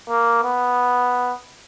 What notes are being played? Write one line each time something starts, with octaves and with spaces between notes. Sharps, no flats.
A#3
B3